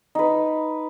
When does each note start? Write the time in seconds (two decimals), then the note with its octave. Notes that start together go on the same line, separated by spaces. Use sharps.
0.15 D#4 B4